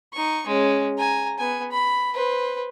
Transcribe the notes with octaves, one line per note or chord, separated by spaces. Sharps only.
D#4 C#6
G#3 C#4
G#5 A#5
B3 G#5
B5
B4 C5